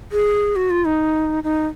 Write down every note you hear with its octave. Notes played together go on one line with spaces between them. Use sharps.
G#4
F#4
F4
D#4
D#4